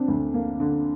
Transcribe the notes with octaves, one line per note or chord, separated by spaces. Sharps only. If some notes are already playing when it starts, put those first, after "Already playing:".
Already playing: D3 C4 D4
D2
A#3
D3